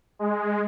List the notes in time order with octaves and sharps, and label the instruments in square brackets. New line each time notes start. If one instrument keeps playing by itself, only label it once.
[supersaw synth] G#3